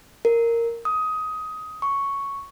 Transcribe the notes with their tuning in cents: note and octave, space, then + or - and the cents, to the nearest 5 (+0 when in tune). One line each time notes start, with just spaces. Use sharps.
A#4 -10
D#6 +15
C#6 +0